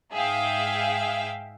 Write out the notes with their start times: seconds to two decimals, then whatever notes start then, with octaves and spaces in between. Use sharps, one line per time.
0.14 G#2 G#4 E5 F5 G5